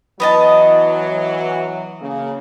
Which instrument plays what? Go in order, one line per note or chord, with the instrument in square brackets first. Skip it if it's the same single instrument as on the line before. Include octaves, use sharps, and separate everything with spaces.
[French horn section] E3 F#3 [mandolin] B3 D#5 A5
[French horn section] C#3 A#3